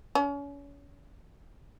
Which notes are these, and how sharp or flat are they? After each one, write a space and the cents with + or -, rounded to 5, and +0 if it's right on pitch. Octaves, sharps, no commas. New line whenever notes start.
C#4 +35